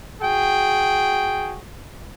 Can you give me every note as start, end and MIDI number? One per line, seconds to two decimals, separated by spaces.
0.21 1.56 66
0.21 1.56 68
0.21 1.56 79